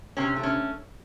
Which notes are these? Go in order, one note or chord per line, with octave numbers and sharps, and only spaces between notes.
C3 C#4
A3
C#4